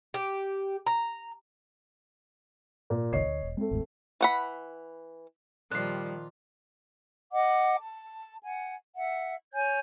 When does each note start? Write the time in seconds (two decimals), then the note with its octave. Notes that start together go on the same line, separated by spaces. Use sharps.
0.14 G4
0.87 A#5
2.90 A#2
3.13 F#1 C#2 D#3 C#5 D#5 C7
3.26 D2
3.43 E1
3.57 G#3 A3 C4
3.71 G1 D#2 G#2
4.21 E3 F#5 B5
5.72 A#2 D#3 F3 G3 F4 F#6 C7
7.32 D#5 F#5 D6
7.80 A5
8.43 F#5 G#5
8.96 E5 F#5
9.53 C#5 G#5 G6 G#6